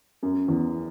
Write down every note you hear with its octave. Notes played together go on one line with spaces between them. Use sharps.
F#2
E2